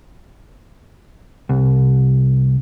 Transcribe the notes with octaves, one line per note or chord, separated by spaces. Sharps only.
C2